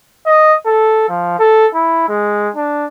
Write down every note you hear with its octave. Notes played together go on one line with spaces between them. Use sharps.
D#5
A4
F3
A4
E4
G#3
D4